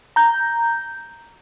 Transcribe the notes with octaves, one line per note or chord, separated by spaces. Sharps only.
A#5 G6